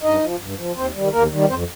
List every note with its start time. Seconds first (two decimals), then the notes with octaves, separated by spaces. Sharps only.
0.02 G2 D#4 D#5
0.21 F3
0.39 G2
0.57 F3
0.76 D#2 C4 C5
0.94 D#3 G3
1.12 D#2 A#3 A#4
1.31 D#3 G3
1.49 F2 C4 C5